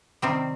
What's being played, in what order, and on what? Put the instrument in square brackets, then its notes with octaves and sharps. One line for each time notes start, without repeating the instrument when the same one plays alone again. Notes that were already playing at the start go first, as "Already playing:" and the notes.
[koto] C3 D#3 G3 C4